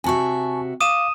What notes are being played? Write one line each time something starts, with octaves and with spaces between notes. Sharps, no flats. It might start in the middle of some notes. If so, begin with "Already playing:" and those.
C3 F#4 E5 G#5 A5 C#6
F5 D6 D#6 D#7 E7